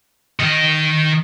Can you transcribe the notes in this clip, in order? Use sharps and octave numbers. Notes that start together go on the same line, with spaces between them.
D#3 D#5